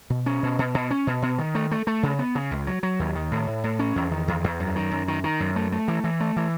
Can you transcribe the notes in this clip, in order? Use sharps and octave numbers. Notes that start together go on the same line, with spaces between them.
B2
C#4
B2
B2
B2
C#4
B2
B2
D#3
A3
A3
A3
C#3
B3
C#3
C#2
F#3
F#3
D#2
D#3
A2
A2
A2
C#4
E2
D#3
E2
E2
F#2
D#3
F#2
D#3
D#3
F#2
A3
A3
E3
E3
A3
E3